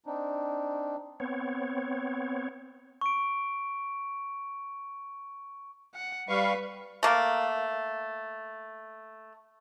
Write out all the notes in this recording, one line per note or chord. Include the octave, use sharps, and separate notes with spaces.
C4 D4 D#4
B3 C4 C#5
C#6 D7
F#5
G3 B4 F5 C#6
A3 A#3